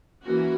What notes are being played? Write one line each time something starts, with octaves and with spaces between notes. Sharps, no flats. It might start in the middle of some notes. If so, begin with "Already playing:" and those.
E3 A#3 C#4 F#4